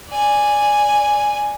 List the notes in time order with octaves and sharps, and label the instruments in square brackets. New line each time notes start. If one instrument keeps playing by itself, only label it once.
[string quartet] D5 G#5